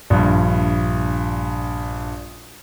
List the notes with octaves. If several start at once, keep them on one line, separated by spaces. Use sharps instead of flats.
A#1 G2